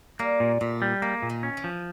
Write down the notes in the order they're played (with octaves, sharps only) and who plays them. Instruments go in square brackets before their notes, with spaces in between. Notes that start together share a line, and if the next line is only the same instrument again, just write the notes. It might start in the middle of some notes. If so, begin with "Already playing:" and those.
[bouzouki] G3 [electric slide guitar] A#3
[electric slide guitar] A#2
[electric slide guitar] A#2 [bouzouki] A3
[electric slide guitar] G3
[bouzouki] G#3 [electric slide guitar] A#3
[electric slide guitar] A#2
[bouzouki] D#3
[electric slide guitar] C#4
[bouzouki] E3
[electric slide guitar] F3